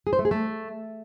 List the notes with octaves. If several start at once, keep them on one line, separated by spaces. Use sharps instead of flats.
G#4
C5
A3
G#4
A3